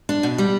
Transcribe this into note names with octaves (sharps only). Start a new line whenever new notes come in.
D4
B2
G3